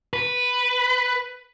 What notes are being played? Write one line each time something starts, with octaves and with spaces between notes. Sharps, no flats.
B4